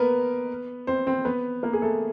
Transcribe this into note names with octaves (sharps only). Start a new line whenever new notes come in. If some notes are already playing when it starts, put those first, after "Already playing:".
Already playing: A#3 B3 A#4 B4
C4 C5
C4 C5
B3 B4
A#3 A#4
G#4
A3 A4